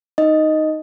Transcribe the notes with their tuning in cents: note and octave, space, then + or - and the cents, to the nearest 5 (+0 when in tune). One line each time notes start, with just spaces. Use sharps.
D#4 +0 D#5 +0